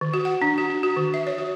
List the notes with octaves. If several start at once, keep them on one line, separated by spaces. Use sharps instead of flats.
D#3
F#4
F#5
D4
F#4
D4
F#4
D#3
E5
C#5
F#4